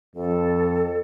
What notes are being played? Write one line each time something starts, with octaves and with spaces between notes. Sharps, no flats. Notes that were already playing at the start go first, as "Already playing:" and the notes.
F2 A4